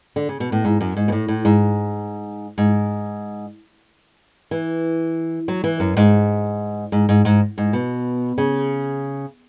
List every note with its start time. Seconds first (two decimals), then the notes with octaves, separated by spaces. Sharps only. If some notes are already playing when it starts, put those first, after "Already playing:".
0.16 D3
0.29 C#3
0.40 B2
0.52 A2
0.65 G#2
0.80 F#2
0.96 G#2
1.08 B2
1.12 A2
1.28 A2
1.45 G#2
2.58 G#2
4.51 E3
5.48 F#3
5.64 E3
5.80 F#2
5.97 G#2
6.92 G#2
7.09 G#2
7.25 G#2
7.58 G#2
7.73 B2
8.38 C#3